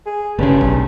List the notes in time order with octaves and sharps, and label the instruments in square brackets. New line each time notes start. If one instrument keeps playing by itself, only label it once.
[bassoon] G#4
[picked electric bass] G1 C#3 [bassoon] G2 [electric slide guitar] A3 C#4 G#4
[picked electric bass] B1